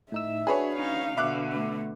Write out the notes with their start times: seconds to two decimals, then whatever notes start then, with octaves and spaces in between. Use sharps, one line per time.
0.12 A2 D#4 E5 E6
0.47 D4 F#4 G#4 B4 C#5
0.76 C#4 D#4 F5
1.17 B2 D3 E5 D6 F#6
1.52 A3